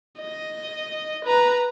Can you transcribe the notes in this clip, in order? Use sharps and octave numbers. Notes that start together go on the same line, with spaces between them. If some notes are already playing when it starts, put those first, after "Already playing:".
D#5
B4 A#5